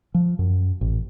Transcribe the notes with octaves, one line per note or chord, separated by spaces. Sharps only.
F3
F#2
A1